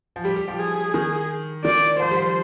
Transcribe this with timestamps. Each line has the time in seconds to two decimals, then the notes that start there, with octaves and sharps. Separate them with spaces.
0.16 F3
0.25 G3 G4
0.36 G3
0.48 F3
0.59 G#4
0.94 D#3
1.65 D#3 D5
2.00 F3 C5
2.11 G3
2.17 F3